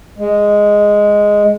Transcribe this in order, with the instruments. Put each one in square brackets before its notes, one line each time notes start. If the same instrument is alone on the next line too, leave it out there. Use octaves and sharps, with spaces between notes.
[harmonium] G#3